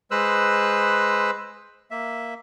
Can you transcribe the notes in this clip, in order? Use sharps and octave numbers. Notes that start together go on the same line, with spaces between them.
G#3 B4 C5 E6 F#6
A#3 E5